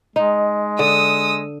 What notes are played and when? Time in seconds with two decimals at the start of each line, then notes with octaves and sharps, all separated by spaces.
0.16 G#3 D#4
0.79 D3 D#6 E6